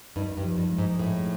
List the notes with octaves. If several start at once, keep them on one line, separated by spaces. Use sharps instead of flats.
G2 D#4
G2
F3
G2
G#3
G#2
A2 A4